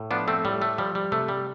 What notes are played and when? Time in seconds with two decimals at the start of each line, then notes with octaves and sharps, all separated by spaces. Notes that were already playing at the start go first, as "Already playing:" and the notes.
Already playing: A2
0.11 F3 B3 D4
0.28 A3 C4
0.44 A2 G3
0.62 A3
0.78 F3 G3
0.95 G3
1.12 C3 A3
1.28 G3